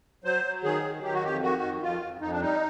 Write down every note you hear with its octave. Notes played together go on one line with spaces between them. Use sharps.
F#3 C5
F#3
D#3 G#4
F#3
D#3 G4
F#4
F2 G4
D#3 F#4
F2
F2 F4
F2
F2 D#4
D4
G3 D#4